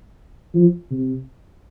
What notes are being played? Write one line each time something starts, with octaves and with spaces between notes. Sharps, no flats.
F3
C3